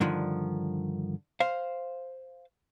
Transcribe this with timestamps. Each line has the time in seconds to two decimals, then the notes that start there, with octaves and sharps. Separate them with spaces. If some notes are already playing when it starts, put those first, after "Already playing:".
0.01 G2 D3 D#3 F3
1.40 C5 F5